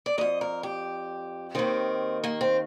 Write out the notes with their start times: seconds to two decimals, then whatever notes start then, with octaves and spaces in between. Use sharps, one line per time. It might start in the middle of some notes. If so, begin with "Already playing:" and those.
0.06 D5
0.18 F2 D#3 D#5
0.41 A#4
0.63 G4
1.55 D#2 D#3 C4
2.24 A#3
2.41 C4